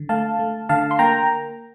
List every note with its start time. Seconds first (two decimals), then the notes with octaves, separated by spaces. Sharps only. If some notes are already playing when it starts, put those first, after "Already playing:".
Already playing: D3
0.09 A3 F5 A5
0.39 A3
0.69 D3 F5 A5
0.91 C6
0.99 A#3 G5 A#5